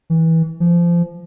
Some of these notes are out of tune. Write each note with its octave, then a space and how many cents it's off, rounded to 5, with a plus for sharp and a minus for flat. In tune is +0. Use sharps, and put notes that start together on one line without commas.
E3 -20
F3 -25